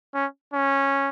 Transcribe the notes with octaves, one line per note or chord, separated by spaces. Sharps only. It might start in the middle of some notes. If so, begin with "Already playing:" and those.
C#4
C#4